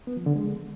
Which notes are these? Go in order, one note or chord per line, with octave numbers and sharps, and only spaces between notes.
B3
F3
D3
G#3